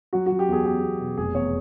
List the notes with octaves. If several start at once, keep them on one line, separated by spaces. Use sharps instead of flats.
F#3 F#4
F#3 F#4
G4
E2 G#4
E2 G4
E2
B2
F1 G#4
E2 C#5